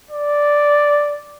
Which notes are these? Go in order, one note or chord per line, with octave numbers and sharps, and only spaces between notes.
D5